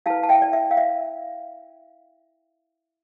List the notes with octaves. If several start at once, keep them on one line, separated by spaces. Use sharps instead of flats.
E4 B4 F5 A5
A5
E5 G5
D5
E5
F5
E5